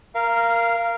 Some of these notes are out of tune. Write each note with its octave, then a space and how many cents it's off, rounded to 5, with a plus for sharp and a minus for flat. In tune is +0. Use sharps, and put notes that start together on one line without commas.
A#4 +0 F5 -15